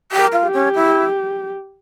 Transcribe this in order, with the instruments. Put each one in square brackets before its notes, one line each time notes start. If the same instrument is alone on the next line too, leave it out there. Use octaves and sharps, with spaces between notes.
[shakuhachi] G4
[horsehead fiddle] A#4
[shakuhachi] F4
[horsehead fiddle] G4
[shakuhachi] C#4
E4